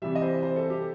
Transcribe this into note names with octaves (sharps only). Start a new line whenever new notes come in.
C3 E3 G3 E5
D#5
C5
C5
A4
G4